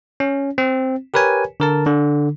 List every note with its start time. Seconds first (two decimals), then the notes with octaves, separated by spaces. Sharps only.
0.20 C#4
0.58 C4
1.14 G4 A#4 B4 C#5 G#5
1.60 D3 A#4 A5
1.86 D3